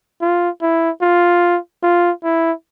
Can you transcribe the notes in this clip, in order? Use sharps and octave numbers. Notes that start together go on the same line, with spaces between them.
F4
E4
F4
F4
E4